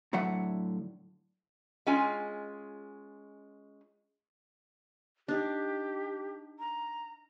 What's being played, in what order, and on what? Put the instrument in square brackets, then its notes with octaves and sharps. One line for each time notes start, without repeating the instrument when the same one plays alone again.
[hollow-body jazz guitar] A2 D3 F#3 E5 F#5
[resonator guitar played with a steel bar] G#3 C#4 F4 G#5
[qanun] D4 D#4 [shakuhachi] G4
[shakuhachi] A#5